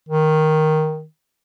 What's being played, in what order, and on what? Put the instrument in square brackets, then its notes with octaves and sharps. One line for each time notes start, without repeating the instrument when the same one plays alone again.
[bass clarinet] D#3